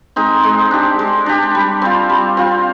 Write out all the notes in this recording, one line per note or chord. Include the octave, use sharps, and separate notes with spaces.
G#3 C4 D#4
G#3
D4 G4
G#3
D4 G4
G3
C4 F4
G3
C4 F4